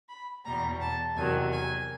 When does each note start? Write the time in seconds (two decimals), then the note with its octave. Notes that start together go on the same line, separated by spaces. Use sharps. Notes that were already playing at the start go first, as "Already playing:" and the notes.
0.09 B5
0.45 E2 B2 G3 A#5
0.81 A5
1.17 E2 C3 D#3 F#3 G#5
1.53 G#5